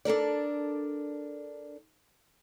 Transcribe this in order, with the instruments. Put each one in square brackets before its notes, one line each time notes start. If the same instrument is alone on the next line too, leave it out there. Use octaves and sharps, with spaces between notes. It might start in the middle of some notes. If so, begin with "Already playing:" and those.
[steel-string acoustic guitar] D4 A4 A#4 D5